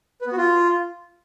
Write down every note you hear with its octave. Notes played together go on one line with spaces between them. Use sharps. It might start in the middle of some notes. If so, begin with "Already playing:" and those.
B4
B3
F#4
F4